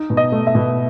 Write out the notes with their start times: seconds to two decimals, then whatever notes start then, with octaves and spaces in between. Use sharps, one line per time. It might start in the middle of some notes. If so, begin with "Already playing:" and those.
Already playing: D#4
0.10 B2
0.17 D#5
0.32 A3
0.47 E5
0.55 B2